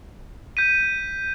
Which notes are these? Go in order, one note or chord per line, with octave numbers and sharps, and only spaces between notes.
G6 B6 D#7